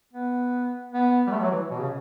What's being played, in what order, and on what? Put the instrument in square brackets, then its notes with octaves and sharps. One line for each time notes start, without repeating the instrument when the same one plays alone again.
[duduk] B3
B3
G3
A3
F#3
E3
B2
C#3